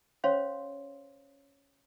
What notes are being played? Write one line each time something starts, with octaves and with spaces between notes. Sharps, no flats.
C#4 C5 C#5 F5 C6